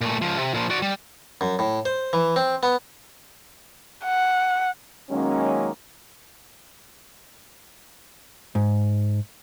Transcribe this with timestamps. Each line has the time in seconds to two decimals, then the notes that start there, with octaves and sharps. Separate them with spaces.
0.01 A#2 A3
0.22 C#2 F3
0.37 C3
0.54 A#2 F3
0.70 F#4 D5
0.82 G3
1.41 F#2
1.59 A2
1.86 C5
2.13 E3
2.36 C4
2.63 B3
4.05 F#5
5.10 D#3 F#3 G#3 A#3 C#4
8.55 G#2